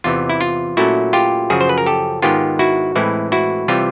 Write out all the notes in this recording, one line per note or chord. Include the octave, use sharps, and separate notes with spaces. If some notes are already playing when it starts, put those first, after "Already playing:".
E2 C3 E3 F4
E4
F4
A#2 F#3 A3 C#4 E4 F#4
F4 G4
F#2 C#3 F3 F#4 G#4
C5
B4
A#4
G4 A4
G#2 D#3 G#3 B3 F4 G4
E4 F#4
A2 E3 G#3 C4 E4
E4 F#4
C3 E3 G3 F4